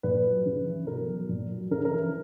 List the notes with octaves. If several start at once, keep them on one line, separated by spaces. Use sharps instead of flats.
A#2 B4
F#3
C#3
E3
B2 A#4
F#3
A#2
F#3
C#3 A#4
A#4
E3